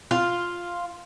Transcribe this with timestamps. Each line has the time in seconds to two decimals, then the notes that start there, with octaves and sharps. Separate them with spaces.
0.11 F4